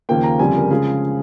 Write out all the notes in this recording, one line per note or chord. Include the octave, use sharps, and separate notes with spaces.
D#2 C#3 F3 A#3 G5
A#5
G1 F2 C#3 G3 C4 G#5
A#4
C#3 F3 G#3 G#4